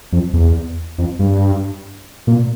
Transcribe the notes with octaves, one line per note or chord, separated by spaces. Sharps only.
F2
E2
F2
G2
A#2